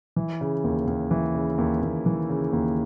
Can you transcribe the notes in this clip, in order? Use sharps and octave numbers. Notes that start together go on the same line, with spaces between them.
E3
C#3
D#2
D#2
E3
C#3
D#2
D#2
E3
C#3
D#2